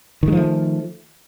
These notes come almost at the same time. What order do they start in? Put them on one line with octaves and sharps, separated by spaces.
D#3 G#3 F3 A3